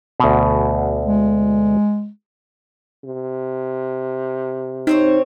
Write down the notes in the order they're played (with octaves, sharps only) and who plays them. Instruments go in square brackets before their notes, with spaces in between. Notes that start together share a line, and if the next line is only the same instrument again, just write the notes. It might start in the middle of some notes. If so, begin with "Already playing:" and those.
[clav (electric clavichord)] D2 B2
[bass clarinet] G#3
[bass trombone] C3
[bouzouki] C4 C5 C#5 [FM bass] D#4